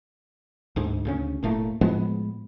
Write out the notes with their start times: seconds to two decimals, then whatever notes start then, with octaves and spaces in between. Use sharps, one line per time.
0.76 D2 G#2
1.05 D2 C#3 C#4
1.43 E1 A2 A3 A#3
1.81 A2 F3 G#3 B3